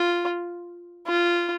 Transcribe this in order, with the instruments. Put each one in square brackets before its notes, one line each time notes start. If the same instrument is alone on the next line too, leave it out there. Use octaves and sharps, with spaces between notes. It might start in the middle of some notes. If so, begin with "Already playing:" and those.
Already playing: [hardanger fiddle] F4
F4